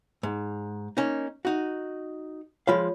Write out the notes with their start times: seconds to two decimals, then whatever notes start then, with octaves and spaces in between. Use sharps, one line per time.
0.23 G#2
0.97 A#3 C#4 D#4
1.45 D#4 F#4
2.67 F3 G#3 F4 C#5 F5